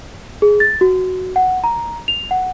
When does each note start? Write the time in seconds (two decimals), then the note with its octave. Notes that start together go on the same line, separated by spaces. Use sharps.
0.42 G#4
0.60 A6
0.81 F#4
1.36 F#5
1.64 A#5
2.08 F7
2.31 F#5